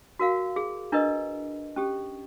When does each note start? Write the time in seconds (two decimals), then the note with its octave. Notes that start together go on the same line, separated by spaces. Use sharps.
0.19 F#4 A#4 F5
0.56 G#4
0.92 D4 E4 A#4 B4 D#5
1.76 C#4 G4 A4